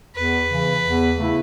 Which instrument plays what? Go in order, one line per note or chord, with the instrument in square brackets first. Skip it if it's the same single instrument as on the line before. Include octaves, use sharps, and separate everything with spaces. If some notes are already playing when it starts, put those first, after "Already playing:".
[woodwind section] E2 [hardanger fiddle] B4
[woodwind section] C#3 E3
E2
C#3 A3 E4